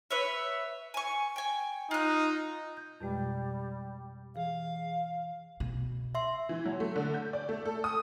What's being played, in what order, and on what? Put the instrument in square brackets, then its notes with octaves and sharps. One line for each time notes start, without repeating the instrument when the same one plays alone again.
[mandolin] B4 C#5 E5
G#5 C#6
G5 G#5
[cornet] D#4 [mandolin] F4 F#6
[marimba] G6
[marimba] F2 B2 G#3 [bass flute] G3
[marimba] E3 G#4 [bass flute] F5
[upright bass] B2
[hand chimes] E5 C6
[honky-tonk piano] E3
F#3
A3
D3
G6
D5
A3
A4
D#6